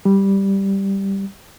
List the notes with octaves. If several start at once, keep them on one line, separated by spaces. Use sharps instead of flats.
G3